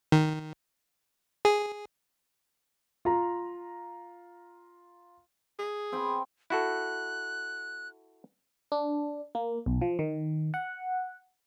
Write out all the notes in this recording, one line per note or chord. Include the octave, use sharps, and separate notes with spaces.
D#3
G#4
F4 A#5
G#4
C4 G5 B5
E4 F#4 A4 F#6
D4
A#3
B1
F3
D#3
F#5